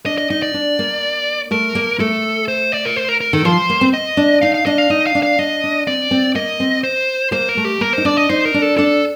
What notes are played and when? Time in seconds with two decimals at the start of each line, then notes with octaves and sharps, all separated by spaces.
0.06 D4 D#5
0.18 D#5
0.30 D#4 D#5
0.42 D5
0.54 D4
0.79 A#3
1.51 A3 A#4
1.75 A#3
2.00 A3 A4
2.48 C5
2.72 D5
2.85 A#4
2.96 C5
3.08 A#4
3.21 A#4
3.33 D#3 A4
3.45 F3 C5
3.70 A#3
3.81 C4
3.94 D#5
4.17 D4
4.42 D#4 F5
4.54 F5
4.66 D4 D#5
4.78 F5
4.90 D#4 D#5
5.07 F5
5.15 D4
5.23 F5
5.39 D4 D#5
5.64 D4
5.87 C4 D5
6.11 C4
6.35 A#3 D#5
6.60 C4
6.84 C5
7.32 A#3 C5
7.49 A#4
7.57 A3
7.65 G4
7.81 A#3 A#4
7.93 D#4 C5
8.05 D4 D5
8.17 D#5
8.29 D#4 C5
8.46 A#4
8.54 D4
8.62 A4
8.78 D4 A4